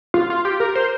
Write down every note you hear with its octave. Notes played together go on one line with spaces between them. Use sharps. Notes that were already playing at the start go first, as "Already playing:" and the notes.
F4
F4
G4
A#4
C5